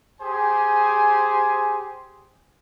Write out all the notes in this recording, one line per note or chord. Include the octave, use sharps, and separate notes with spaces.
G4 G#4 C5 G#5